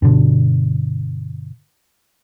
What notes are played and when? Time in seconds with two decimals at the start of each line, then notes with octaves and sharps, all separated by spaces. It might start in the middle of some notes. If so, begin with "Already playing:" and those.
0.02 G2 B2 D3